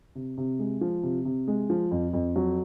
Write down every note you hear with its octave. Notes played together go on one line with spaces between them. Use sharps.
C3
C3
G#3
F3
C3
C3
G#3
F3
F2
F2
F#3